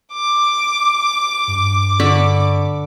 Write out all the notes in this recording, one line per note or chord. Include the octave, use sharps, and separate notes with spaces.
D6
G2
D3 B5 C#6